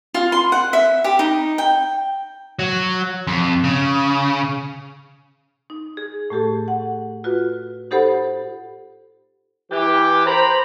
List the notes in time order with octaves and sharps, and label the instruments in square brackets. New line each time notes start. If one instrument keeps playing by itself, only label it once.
[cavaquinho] F4
C6
F#5
E5
G4
D#4
G5
[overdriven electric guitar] F#3
F2
C#3
[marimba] D#4
G#4
A2 A3 G4 A4
F#5
F4 F#4 B4
D#4 G4 A4 C5 F#5 B5
[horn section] E3 G4
C5 A#5 B5